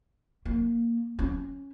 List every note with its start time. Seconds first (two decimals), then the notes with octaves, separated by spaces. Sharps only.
0.45 A#3
1.19 C#4